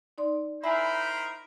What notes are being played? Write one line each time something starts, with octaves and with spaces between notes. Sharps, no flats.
D#4 D5 C6
D#4 E4 A#4 C5 E5 G#5 A#5 B5